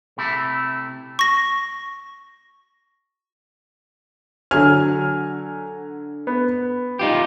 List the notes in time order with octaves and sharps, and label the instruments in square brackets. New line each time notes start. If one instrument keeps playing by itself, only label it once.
[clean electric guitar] C3 A3 E4
[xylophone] C#6 A#6
[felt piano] D3 F6 [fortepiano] F#3 G#5
[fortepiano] B3
[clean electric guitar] D#4 F4 G4